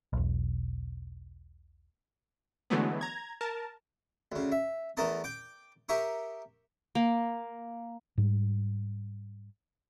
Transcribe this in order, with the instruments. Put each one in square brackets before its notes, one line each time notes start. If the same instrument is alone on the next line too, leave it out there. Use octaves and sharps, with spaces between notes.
[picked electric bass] E1 B1
[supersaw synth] D3 E3 F#3 G#3 A3 B3
A#5 G#6
A#4 A5
[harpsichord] D2 C#3
E5
E2 A3 A#4 D#5 A5 D#6
G5 D6
G4 A#4 E5 C#6 D#6
[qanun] A#3
[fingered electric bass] G#2 G3